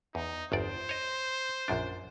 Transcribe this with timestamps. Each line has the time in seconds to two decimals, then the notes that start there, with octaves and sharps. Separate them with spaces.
0.15 E2 D#4
0.52 G1 E2 C5 D5
0.89 C#5 D#5
1.68 A#1 F#2 D4